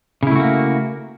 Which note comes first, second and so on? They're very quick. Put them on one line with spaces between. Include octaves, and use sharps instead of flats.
C#3 E4 A3 F#4 A#3